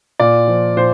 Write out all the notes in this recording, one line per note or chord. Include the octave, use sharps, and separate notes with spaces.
A#2 D5
F3
A#2 C5